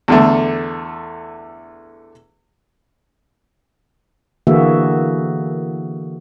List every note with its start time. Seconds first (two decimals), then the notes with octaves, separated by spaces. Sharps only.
0.08 E2 D3 A3
4.47 D3 E3 A#3 F#4 G#4 E5